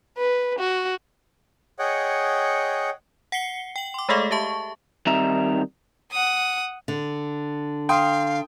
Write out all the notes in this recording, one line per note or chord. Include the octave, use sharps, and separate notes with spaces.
B4
F#4
G#4 C#5 D#5 F#5 G5
F#5 C7 C#7 G7
G5 F#7
C6 D6
G#3 A3 G#4 A4 D#5 F5
G4 E5 A5 C#6
D#3 G3 C4 D#4 E5 A#5
F#5 D#6
D3
F5 G5 C6 D#6